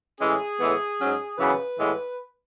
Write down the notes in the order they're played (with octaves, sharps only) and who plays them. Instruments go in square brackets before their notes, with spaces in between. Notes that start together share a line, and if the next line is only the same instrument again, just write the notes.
[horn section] A2 E3 G#3 C#4 G#4
A2 E3 G#3 B3
G#2 F#3 C#4
F#2 C#3 E3 B3 B4
A2 E3 G#3 B3